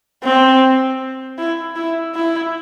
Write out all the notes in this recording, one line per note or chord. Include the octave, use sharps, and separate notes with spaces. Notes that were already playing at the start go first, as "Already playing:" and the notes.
C4
E4
E4
E4